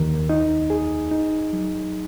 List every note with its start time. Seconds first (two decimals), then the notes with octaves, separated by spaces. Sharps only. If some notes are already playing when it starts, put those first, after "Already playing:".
Already playing: D#2 D#3 A#4
0.29 D#4
0.70 G#4
1.11 D#4
1.53 F#3